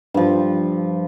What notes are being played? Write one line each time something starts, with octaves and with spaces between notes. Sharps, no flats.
G2 F3